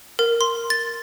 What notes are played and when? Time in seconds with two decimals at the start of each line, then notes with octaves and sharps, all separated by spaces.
0.19 A#4
0.41 C6
0.70 A6